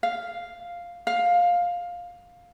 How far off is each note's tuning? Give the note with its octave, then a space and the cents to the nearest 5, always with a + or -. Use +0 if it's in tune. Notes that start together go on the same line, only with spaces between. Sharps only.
F5 +0
F5 +10